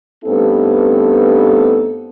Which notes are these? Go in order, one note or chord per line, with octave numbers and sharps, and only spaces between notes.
G2 A3 B3 C4 D#4 A4